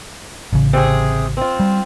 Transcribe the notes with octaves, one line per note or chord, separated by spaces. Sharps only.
A1 C#3
C3 G#4
C4 F4
G3